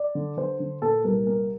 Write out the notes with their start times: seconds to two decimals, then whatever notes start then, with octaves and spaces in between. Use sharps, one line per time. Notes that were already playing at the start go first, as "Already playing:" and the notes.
Already playing: D5
0.15 D3
0.37 D3 C5
0.60 D3
0.82 A#2 A4
1.04 C2 A#4
1.26 A#3 A#4